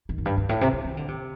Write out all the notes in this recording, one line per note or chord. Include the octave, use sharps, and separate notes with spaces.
D#3
F#2
G2
G2
A2
C3
D#3
D#3
D3
C3